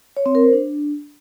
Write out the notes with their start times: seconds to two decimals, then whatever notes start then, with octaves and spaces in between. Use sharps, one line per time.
0.17 C#5
0.26 C4
0.35 A#4
0.44 C5
0.53 D4